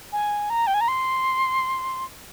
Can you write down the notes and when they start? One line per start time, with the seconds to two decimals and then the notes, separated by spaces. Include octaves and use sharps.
0.12 G#5
0.50 A#5
0.67 G5
0.74 G#5
0.81 A#5
0.88 C6